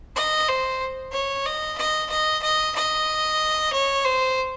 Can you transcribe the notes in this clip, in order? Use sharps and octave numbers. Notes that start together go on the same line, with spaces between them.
D#5
C5
C#5
D#5
D#5
D#5
D#5
D#5
C#5
C5